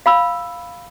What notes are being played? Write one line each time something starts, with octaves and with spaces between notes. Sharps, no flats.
F5 B5 E6